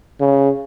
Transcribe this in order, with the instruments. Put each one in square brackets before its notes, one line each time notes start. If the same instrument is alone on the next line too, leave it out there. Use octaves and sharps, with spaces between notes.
[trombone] C#3